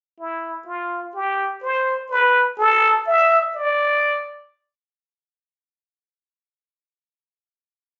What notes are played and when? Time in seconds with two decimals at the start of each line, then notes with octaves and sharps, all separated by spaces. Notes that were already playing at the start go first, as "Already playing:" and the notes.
0.20 E4
0.67 F4
1.15 G4
1.62 C5
2.10 B4
2.58 A4
3.06 E5
3.55 D5